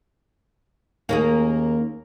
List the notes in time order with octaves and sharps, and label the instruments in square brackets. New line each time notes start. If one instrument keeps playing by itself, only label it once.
[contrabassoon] D#2 [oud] A#3 C#4 G#4